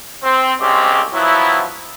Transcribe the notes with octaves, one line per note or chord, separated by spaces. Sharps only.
C4
C2 G#3 C4 C#4 G4
F3 F#3 B3 E4